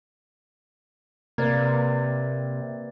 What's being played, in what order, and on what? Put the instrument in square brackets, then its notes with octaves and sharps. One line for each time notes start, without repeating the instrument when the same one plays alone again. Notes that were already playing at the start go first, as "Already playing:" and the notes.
[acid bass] C3 [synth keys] A#3 [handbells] B4 D5 G#6